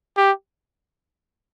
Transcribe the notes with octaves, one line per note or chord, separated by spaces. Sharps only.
G4